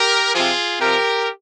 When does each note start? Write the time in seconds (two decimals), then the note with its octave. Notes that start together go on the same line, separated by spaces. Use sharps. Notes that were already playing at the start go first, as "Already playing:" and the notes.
Already playing: G4 A#4
0.34 C3 F3 F4 G#4
0.79 C3 F3 G4 A#4